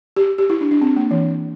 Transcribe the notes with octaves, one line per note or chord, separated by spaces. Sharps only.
G4
G4
E4
D4
D4
C4
A#3
E3